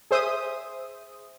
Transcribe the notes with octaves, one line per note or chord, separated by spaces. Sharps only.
G#4 C5 E5 D#6